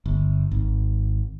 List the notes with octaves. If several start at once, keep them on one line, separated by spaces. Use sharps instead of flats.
G1
G#1